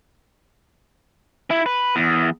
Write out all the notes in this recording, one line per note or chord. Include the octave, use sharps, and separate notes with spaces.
E4
B4
E2